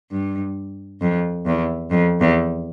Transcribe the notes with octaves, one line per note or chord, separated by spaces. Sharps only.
G2
F2
E2
F2
E2